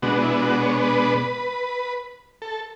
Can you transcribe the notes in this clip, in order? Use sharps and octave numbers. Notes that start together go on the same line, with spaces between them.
B2 G#3 B3 D4 F#4
E4
F#4
C#5
B4
A4